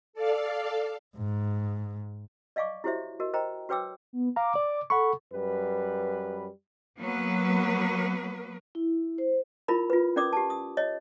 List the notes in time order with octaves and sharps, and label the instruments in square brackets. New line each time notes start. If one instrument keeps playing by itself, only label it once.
[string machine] A4 D5 F5
[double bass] G#2
[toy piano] D5 D#5 F5 G#5 C#6 D6
E4 F#4 G4 C5 C#5 E5
F#4 A#4 D#5
A#4 C5 D#5 G5 A#5
F#4 B4 C#5 G5 D6 E6
[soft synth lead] B3
[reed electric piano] F5 A#5 [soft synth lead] D6
[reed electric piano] D5
[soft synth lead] A4 [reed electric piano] F#5 B5 C#6
[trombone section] F#2 G3 B4
[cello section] F#3 A#3 B3 B4
[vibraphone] E4
C5
[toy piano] E4 F4 A#4 B5
F4 B4
C#4 A#4 D5 D6 D#6
G4 A5
D#6
C#5 D#5